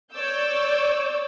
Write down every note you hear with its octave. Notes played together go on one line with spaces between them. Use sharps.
C#5 D5 D6 E6 G6